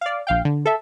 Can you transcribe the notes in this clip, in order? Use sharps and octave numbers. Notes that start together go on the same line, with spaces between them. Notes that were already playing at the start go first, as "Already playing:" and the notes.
D5 F5
A#1 F5 G5
D3
A4 E5